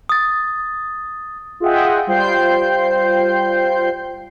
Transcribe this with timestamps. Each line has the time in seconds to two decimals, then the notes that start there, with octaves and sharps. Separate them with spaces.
0.09 D#6 A6
1.60 F4 G#4 D#5 E5 F#5 G5
2.07 G3 F4 C5 G5 G6 C7